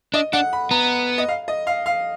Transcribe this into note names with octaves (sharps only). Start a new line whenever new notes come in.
D4 D#5
D4 F#5
B5
B3 A#5
D#5
F5
D#5
F5
F5